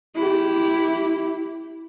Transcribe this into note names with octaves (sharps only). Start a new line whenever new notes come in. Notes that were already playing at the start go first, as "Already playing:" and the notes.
E4 G4